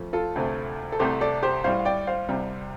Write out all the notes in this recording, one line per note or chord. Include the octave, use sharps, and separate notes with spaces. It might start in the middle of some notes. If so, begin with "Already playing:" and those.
Already playing: F2 F3 A3
F4 A4
D2 C3 A3
A4
C2 C3 A3 G4 C5
A4 D5
G4 C5
A2 G3 C5 F5
F5
D5 G5
C5 F5
C2 C3 G3